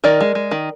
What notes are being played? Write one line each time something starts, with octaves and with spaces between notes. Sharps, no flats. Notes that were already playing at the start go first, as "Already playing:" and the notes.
D#3 A#4 D5
G#3
G#3
D#3